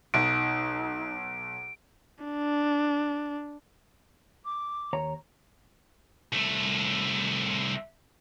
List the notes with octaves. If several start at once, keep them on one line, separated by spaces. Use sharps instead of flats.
B1 D#4 D7
D4
D6
D#2 C#5 A#5
C2 A3